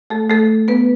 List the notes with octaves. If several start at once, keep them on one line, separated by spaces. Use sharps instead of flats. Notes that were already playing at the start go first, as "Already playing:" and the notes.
A3 A4
A3 A4
B3 B4